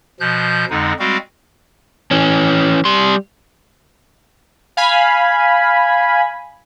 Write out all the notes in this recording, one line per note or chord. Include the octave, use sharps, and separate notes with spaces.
B2 F3 F#6 G6
F2 D3 G#3 D#4
G3 G#3 C4 F#4 F5
E3 C#4
G3 C6
F5 G#5 B5